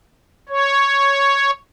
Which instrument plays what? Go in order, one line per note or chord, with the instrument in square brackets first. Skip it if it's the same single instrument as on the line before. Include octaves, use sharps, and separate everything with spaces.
[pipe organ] C#5